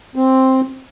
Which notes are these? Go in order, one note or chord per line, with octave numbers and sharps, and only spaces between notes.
C4